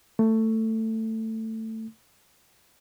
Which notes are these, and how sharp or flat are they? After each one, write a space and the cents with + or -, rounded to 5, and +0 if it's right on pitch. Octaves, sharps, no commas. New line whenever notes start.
A3 +15